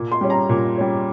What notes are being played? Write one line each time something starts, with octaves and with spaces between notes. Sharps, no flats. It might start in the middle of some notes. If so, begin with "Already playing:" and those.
Already playing: A#2
C6
G3 C#4
A#5
A#2
G3 C#4